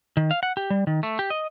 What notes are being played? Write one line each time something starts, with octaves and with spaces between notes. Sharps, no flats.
D#3
F5
F#5
G4
G3
D#3
A3
G4
D#5